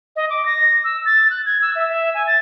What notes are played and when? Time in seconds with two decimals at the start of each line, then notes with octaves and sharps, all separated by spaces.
0.16 D#5
0.30 D6
0.46 A#6
0.84 E6
1.06 A6
1.30 F#6
1.46 G#6
1.62 E6
1.75 E5
1.89 E5
2.14 G#5
2.27 A6